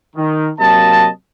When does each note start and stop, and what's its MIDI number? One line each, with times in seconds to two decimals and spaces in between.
0.16 0.49 51
0.59 1.07 48
0.59 1.07 54
0.59 1.07 58
0.59 1.07 75
0.59 1.07 81